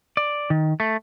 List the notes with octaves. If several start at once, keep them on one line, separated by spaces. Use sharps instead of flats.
D5
D#3
A3